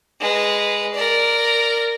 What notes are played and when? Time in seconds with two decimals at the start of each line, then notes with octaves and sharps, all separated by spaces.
0.20 G#3 B4
0.94 A#4 D5